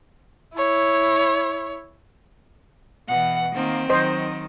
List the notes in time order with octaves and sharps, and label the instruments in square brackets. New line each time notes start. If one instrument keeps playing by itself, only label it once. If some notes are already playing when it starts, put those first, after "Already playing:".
[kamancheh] E4 C#5
[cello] B2 E3 [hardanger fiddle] F#5
[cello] D#3 A#3 [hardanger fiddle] C4
[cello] D#3 F#3 [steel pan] C5 D#5